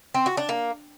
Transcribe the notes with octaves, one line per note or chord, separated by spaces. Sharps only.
C4
F#4
D4
A#3